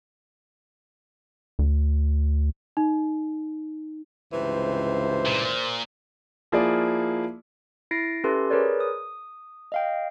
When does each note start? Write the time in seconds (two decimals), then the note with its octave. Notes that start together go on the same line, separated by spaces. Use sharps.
1.59 D2
2.77 D#4
4.33 C#2 G2 C3 E3 C5
5.26 A#2
6.52 F3 A#3 E4 F4 G#4 D5
7.91 E4 A6 A#6 C7 D7
8.24 C#4 G4 A4 B4 E5 C6
8.50 G#4 A#4 B4 C#5 D5
8.80 D#6
9.72 D#5 F5 G5